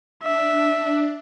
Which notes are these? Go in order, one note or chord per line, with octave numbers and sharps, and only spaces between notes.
D4 E5